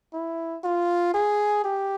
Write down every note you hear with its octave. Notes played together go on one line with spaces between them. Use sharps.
E4
F4
G#4
G4